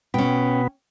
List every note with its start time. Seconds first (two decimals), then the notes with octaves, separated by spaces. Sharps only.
0.14 B2 B3 C#4 G5